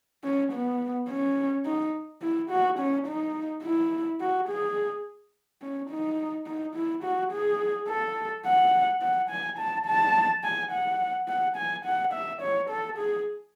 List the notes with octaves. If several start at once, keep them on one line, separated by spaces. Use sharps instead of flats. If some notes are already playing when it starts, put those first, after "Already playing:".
C#4
B3
C#4
D#4
E4
F#4
C#4
D#4
E4
F#4
G#4
C#4
D#4
D#4
E4
F#4
G#4
A4
F#5
F#5
G#5
A5
A5
G#5
F#5
F#5
G#5
F#5
E5
C#5
A4
G#4